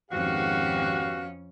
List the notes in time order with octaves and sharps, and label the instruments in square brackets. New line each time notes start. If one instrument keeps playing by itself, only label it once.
[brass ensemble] G#1 G4 [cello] F2 C#4 [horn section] B3 F#4 [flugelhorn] F5